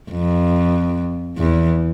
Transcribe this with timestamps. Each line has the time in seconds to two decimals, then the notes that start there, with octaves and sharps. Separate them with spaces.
0.12 F2
1.38 E2